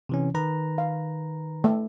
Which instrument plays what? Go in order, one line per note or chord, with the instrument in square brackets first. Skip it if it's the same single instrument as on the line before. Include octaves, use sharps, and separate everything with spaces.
[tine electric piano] C3 E3 C#4
D#3 B4 A#5
[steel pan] F5
A3